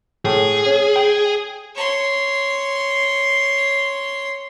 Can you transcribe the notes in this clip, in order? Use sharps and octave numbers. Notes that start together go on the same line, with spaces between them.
A2 G#4
C#4
G5
C#5 C6